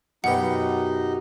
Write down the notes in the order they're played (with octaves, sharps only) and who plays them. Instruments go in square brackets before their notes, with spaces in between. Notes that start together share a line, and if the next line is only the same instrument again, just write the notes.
[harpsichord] F#2 G4 [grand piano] B2 B4 [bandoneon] D#4 [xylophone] F#5